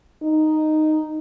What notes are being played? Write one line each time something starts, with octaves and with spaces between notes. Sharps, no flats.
D#4